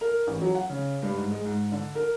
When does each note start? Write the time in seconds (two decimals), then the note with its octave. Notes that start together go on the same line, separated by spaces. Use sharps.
0.01 A#4
0.27 A1
0.41 F#3
0.55 F#5
0.70 C#3
1.03 G2
1.17 G#2
1.31 G#3
1.45 G#2
1.72 D3
1.95 A#4